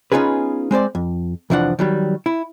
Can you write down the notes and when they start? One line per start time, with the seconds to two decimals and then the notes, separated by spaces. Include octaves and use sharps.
0.12 B3 C#4 D#4 F4 G#4 B4
0.71 G#3 C4 C5 D5
0.95 F2
1.50 C2 F2 E3 F3 D4 F#5
1.79 D#3 F#3 G3
2.26 E4